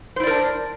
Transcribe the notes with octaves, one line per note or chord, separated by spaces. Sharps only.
D4 E4 A#4 C5 D5